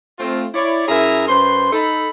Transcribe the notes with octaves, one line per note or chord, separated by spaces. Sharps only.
A3 C4 F4
E4 C#5 D5
F#2 E4 G#4 A#4 E5 A#5
F#2 B4 C5 C6
D#4 A4 B5